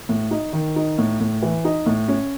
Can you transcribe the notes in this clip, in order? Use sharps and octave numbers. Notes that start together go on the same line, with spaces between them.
A2
D#4
D#3
D#4
A2
A2
E3
D#4
A2
C#4